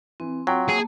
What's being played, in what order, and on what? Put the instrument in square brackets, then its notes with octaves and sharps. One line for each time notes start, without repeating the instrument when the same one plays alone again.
[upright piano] E3 [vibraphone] C4
[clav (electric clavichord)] F#3 [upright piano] F4 G5 C6
[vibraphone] A#3 A5 [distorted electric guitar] G#4